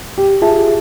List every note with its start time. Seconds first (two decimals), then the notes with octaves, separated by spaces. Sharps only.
0.18 G4
0.42 F4 G#4 E5 A5